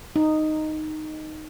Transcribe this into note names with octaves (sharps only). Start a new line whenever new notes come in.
D#4